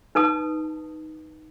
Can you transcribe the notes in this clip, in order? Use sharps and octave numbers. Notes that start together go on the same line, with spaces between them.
D#4 B4 A5 D#6